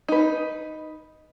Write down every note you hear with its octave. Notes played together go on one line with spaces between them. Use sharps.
D#4 B4